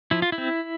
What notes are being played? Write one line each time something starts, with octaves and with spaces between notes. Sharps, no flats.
F3 E4
F4
E4
C4